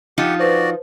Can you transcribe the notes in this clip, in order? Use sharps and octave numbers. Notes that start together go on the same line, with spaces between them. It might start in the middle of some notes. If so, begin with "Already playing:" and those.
F3 D#4 F4 G4 F#5
F#4 B4 C5 D5